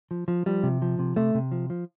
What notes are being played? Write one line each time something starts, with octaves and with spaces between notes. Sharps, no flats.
F3
F3
F3 G3
C3
F3
C3
C3 A3
C3
F3
F3